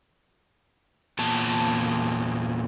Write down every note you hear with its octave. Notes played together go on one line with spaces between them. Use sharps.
E2 A#2 A5